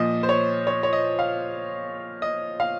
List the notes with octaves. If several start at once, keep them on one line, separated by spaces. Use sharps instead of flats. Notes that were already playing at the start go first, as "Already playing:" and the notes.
Already playing: A#2 F3 D#5
C5
C#5
C#5
C#5
D#5
F5
D#5
F5